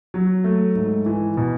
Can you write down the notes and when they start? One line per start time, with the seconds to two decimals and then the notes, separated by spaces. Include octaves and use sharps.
0.14 F#3
0.44 A3
0.75 G#2
1.06 E3
1.37 B2